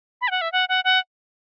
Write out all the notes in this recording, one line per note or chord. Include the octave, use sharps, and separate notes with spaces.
B5
G5
F#5
E5
F#5
F#5
F#5